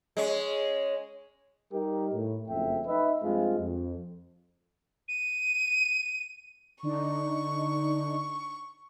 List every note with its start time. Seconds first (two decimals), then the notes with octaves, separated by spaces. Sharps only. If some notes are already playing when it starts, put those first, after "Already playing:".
0.17 G#3 C#4
1.72 G3 D#4 G4 A#4
2.14 A2
2.48 F#1 F2 A3 E5 G5
2.87 D#4 B4 D#5 E5
3.23 G2 F3 G#3 C4 F4
3.60 F2
5.08 D#7
6.83 D3 D4 D#4 C#6